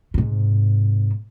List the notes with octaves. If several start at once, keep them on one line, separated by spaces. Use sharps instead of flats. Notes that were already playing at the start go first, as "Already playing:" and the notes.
G#2 C3